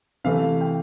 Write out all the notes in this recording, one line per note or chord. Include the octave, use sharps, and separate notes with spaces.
C3 E3 A3 F5
G5